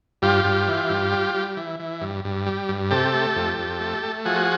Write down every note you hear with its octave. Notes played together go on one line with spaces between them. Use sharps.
G2 F4 G4
G2
E3
G2
G3
G3
E3
E3
G2
G2
G3
G2
C3 G4 A4
A3
F2
F2
A3
A3
F3 F#4 G#4